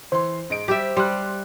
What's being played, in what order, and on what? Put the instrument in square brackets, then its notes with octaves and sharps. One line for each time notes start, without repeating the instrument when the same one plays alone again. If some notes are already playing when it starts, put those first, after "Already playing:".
[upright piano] E3 C6 [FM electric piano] C5
[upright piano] G#2 D#5 D7
[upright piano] G3 [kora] G4 E5
[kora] G3 [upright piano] C6 F#6